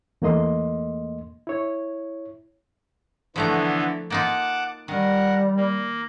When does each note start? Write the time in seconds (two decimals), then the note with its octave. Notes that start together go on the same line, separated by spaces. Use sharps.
0.22 E2 A3 A#3 D#5 C6
1.47 E4 C#5
3.36 D3 E3 F3 A3 B3 A#5
4.10 A#3 D#4 F4 F#5 A5 D6
4.88 D#3 G3 A#4 F#5
5.57 A#3